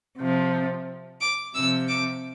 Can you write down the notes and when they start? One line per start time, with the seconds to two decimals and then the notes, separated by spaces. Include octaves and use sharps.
0.17 C3 F3
1.20 D6
1.54 C3 F3 E6
1.88 D6